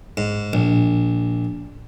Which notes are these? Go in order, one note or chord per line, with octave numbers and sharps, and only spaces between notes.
G#2
A#1